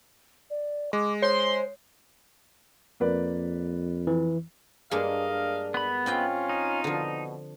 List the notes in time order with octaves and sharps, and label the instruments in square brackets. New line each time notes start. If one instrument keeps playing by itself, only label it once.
[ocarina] D5
[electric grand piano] G#3 [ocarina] D6
[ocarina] C5 [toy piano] C#5 [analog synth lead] C6
[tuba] F2 [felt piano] A#3 B4 D5
[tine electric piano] E3
[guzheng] G2 G#3 A#3 [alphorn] D4 [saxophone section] A#4 D#5 F5
[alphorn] D4
[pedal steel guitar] B3 B5
[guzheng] C4 D#5 G5 [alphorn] C#4 [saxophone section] F4
[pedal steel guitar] D#4
[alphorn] B2 [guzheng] D3 F3